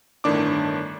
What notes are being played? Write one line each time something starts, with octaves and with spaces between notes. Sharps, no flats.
G1 A2 D#3 D4 D6